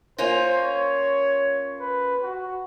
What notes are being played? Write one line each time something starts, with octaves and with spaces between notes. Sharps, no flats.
A#3 C#4 F4 C5
C#5
B4
F#4